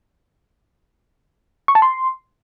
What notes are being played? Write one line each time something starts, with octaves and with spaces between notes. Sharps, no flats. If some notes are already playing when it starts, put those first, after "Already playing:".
C#6
A5
C6